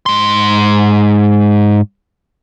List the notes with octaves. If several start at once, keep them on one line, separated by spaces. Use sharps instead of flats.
G#2 C6